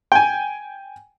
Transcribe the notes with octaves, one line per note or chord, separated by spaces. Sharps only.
G5 G#5